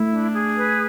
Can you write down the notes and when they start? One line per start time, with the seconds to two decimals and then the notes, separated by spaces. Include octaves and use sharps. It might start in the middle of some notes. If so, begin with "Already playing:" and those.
Already playing: A3 E4
0.09 D4
0.33 G#4
0.56 B4